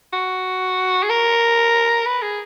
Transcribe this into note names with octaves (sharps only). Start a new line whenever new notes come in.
F#4
G#4
A#4
B4
G#4